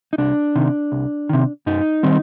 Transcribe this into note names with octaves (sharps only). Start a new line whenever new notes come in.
D#4
C2 D4
C3 D#3
C2
C3 D#3
F#2 D#4
D#3 G3 C4